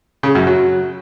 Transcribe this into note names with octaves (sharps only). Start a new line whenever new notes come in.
C#3
F#2
F#3